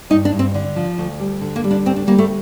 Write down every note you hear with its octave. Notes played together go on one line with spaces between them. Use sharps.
G2 D#4
D4
G2
C4
D3
F3
D2
G3
D3
A#3
G3
D4
D2 C4
D4
G3 A#3
A3